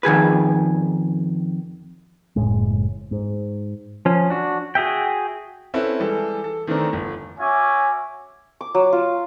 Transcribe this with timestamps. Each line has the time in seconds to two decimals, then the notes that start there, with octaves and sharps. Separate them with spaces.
0.03 F2 D#3 G#4 B4
2.36 F#1 E2 A2 G#3
3.11 G#2
4.05 F3 C#4
4.30 D4 F#4
4.75 F#4 G#4 E5 G5
5.74 C4 C#4 E4 A4 B4
6.00 E3 G3 G#3 A4
6.44 A4
6.67 D#3 E3 A3 C4 D4 A#4
6.93 G1
7.39 C#4 F#4 E5 G#5 D6
8.61 D6
8.75 F#3
8.93 F4